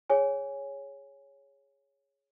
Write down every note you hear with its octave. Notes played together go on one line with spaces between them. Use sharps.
G#4 C#5 G#5